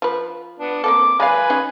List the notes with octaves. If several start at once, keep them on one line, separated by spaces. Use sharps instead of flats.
F3 B4
B3 D4
A#3 C4 A4 D6
G#3 B4 D5 F5 G#5
C#4 D#4 G#4